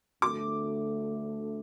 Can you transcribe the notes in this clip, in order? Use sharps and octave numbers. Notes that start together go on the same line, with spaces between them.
D2 D3 A3 D6